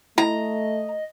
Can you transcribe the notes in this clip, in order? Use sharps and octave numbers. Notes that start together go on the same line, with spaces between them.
A3 E4 D#5 A#5